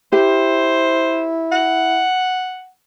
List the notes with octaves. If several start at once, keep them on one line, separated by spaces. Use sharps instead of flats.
E4 G4 C5
F#5